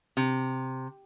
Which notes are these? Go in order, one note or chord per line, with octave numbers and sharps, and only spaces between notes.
C3